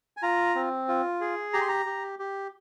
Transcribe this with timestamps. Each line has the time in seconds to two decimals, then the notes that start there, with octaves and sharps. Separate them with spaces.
0.17 G#5
0.22 F4 A#5
0.55 C4
0.88 F4
1.21 G#4
1.53 G4 A#5
1.61 C6
1.69 A#5
1.86 G4
2.19 G4